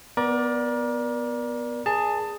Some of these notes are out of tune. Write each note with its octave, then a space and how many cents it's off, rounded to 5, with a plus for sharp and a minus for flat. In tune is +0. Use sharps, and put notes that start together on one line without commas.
B3 +0 A#4 +35 D5 +0
G#4 +0 A5 +15